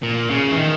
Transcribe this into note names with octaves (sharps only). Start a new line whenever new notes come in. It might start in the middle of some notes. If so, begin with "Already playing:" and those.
A#2
C#3
E3
D#3